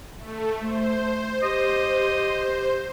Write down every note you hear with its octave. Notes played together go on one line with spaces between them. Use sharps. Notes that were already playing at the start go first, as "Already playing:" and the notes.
A3
A3 C5
G4 D#5